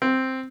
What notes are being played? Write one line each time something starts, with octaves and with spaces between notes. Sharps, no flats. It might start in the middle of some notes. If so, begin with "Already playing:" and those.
C4